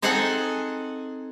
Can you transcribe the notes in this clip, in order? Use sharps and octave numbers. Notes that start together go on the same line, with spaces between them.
C4 D#4 G#4 A4 F#5 G#5